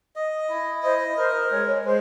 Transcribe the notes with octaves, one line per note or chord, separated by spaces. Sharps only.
D#5
E4
C5 D#5
A#4 C5
C5
G#3 C#5
G#3 C5